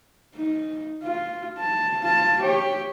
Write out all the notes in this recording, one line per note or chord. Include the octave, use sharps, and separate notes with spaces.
D#4
F4
A5
F4 A5
G4 C#5